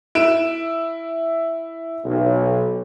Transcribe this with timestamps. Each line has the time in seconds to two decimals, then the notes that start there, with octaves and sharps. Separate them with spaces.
0.15 E4 D7 E7
2.05 B1